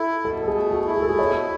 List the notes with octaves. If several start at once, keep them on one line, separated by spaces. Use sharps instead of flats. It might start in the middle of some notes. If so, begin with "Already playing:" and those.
Already playing: E4 A4
B2 A4
A4
G#4
A3
F#4
E4
G#4
A4
G#4
B2 C#5